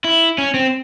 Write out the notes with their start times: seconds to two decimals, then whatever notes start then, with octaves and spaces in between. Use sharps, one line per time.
0.04 E4
0.38 C#4
0.54 C4